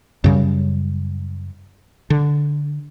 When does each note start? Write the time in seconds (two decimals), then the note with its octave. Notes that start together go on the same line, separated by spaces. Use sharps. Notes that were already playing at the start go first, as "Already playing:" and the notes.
0.24 F#2 C#3 G3
2.10 D3